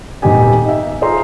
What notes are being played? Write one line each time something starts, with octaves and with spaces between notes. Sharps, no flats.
D#1 G#1 B3 D#4 G4 G#5
D#4 E5
F4 G#4 C5 A#5 C6